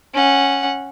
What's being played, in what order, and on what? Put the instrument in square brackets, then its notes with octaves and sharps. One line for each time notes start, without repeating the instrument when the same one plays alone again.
[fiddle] C#4 F#5